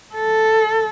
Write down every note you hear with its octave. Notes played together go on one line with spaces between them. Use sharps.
A4